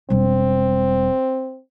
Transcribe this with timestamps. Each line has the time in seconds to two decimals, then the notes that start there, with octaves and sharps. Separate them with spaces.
0.10 E1 G3 C4